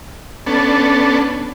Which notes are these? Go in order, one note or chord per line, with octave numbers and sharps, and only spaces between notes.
B3 C#4 D4 A4